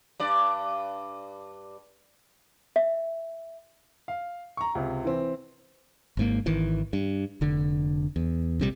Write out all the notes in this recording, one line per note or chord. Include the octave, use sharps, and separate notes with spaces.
G2 D5
E5
F5
A#5 C#6
C#2 C3
E3 C4
G#1 G#2 A#3
G#1 D#3 E3
G2
F1 D3
E2
A#1 C3 G3